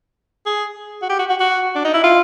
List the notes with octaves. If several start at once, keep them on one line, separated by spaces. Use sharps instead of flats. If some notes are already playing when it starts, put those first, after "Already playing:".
G#4
F#4
G4
F#4
F#4
F#4
D4
D#4
E4
F4